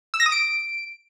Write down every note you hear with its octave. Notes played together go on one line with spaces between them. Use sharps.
E6
A#6
D#6
D7